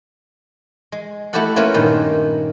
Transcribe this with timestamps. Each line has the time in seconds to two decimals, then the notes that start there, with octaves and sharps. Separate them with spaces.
0.92 G#3
1.33 A3 E4 F#4 G4 A4 F#5
1.56 A#3 C#4 E4 F4 B4 C#5
1.74 G2 A#2 D#3